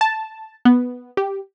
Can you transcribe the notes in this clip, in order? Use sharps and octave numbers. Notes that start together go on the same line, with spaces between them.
A5
B3
G4